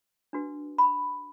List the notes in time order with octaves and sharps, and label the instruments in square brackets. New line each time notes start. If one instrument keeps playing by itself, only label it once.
[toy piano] D4 F#4 B4
B5